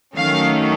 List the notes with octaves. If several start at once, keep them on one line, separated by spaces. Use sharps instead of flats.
D#3 F#3 A3 C#4 F5